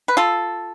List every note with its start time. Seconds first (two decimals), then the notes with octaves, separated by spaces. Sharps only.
0.08 B4
0.17 F4 A4